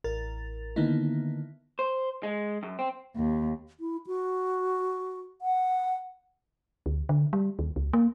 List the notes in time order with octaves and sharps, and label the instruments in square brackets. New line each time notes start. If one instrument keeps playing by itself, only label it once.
[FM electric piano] A1 A#4 A6
D3 D#3 A#3 B3 D#4 E4
[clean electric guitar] C5
G#3
F#2
C4
[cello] D#2
[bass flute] E4
F#4
F#5
[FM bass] D2
D3
G3
D#2
C#2
A#3